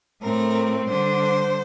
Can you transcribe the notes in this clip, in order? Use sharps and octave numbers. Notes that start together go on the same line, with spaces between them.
A2 A3 C4 A#4
D3 G3 D4 C5